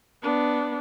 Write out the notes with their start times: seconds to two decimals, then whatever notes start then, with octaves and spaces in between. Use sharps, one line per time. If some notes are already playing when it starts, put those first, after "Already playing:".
0.22 B3 D4